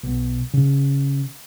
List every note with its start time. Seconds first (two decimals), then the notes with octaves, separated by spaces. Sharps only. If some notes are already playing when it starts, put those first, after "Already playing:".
0.03 B1
0.53 C#3